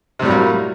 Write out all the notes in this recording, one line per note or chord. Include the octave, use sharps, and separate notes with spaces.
A2 C3 F#3 G3 A#3